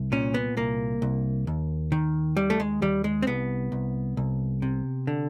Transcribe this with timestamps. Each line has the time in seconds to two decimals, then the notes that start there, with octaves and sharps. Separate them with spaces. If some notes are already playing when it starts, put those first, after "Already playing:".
Already playing: C2
0.12 A#2 C#4
0.34 B3
0.57 C2 A#3
1.02 C2
1.47 D#2
1.92 D#3
2.37 D#2 G3
2.50 A3
2.60 G#3
2.82 D#2 G3
3.04 G#3
3.22 C4
3.27 C2 B3
3.72 C2
4.17 C2
4.62 C3
5.07 D3